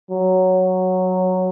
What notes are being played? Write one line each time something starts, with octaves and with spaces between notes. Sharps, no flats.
F#3